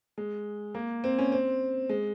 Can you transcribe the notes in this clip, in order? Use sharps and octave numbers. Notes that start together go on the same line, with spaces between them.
G#3
A#3
C4
C#4
C4
G#3